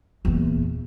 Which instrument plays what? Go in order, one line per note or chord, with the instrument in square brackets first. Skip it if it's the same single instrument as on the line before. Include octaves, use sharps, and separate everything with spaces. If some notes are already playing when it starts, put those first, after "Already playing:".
[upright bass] E2 A#2